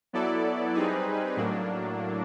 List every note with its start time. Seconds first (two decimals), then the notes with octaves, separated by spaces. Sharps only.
0.13 F#3 B3 E4 A4 D5
0.74 G3 C4 D#4 G#4 B4
1.37 A2 F#3 A#3 D4